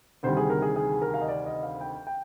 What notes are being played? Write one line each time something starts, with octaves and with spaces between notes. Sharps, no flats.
D2 C3 D#3 G3 C5
G#4
A#4
G#4
G#4
A#4
F5
D#5
D5
D#5
F5
G5
G5